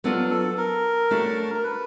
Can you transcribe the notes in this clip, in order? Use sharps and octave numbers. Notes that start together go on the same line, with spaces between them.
F#3 B3 D4 F4 A4
A4
A#4
A3 D4 F#4 A4 C#5
A#4
B4